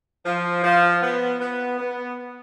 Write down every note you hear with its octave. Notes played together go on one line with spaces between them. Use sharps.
F3
F3
B3
B3
B3